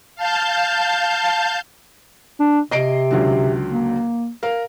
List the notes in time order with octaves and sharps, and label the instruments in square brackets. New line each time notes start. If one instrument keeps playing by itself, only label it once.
[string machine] F5 A5 G6
[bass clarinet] D4
[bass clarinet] C3 [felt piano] D#5 C7 D7
[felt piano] C#2 D3 F#3
[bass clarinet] A#3
[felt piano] A#4 F5